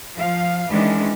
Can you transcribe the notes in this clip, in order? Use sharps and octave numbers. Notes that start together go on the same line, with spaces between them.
F3 F5
D#3 E3 G#3 C#4 D4